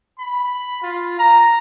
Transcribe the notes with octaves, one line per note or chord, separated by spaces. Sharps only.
B5
F4
A#5